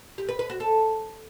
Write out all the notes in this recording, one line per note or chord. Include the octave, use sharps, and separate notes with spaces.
G4
B4
B4
F#4
A4